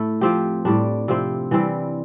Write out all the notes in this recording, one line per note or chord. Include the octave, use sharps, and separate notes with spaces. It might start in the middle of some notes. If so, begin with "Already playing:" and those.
Already playing: A2 A3 E4
F3 C4 G4
A2 G3 D4
C3 F3 C4 E4
E3 G3 C4 E4